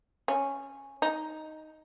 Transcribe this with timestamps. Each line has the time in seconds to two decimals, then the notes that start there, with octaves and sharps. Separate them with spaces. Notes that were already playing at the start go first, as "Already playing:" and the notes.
0.28 C#4
1.02 D#4